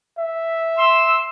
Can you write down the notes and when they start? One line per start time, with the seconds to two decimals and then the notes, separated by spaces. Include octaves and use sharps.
0.19 E5
0.78 C6 E6